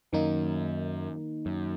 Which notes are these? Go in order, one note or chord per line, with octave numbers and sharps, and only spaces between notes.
F#2 D#3 A#3 D#4
F#2